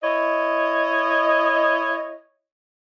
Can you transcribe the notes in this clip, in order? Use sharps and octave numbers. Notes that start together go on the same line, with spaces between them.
E4 C#5 D#5